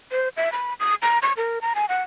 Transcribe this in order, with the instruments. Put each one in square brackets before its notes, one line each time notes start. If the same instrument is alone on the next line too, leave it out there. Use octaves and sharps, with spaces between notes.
[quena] C5
E5
B5
D#6
A#5
C#6
A#4
A#5
G#5
F#5